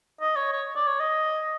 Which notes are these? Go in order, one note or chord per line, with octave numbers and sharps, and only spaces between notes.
D#5
C#5
C#5
D5
C#5
D#5